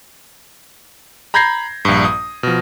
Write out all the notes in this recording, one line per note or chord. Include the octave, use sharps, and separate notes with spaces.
A#5 B5 G6 G#6 A#6 C7
A#1 G2
D#6
B2 F3